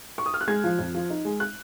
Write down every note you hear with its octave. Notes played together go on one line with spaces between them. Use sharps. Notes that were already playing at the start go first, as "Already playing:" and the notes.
C#6
D#6
F6
F#6
G#3 G#6
F3
F2
F3
D#4
G#3
F#6